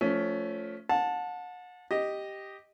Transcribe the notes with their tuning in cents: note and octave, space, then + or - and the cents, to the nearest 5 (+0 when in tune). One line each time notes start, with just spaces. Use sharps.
F3 +0 A3 +0 C#4 +20
F#5 -35 A5 +0
G4 +0 D#5 +0